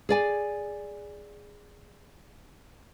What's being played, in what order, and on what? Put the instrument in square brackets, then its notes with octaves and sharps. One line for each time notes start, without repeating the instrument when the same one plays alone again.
[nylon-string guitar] G#4 D5 G#5